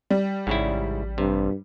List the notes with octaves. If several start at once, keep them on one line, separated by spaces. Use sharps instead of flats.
G3
A1 G#2 C#3 E4
G2 C3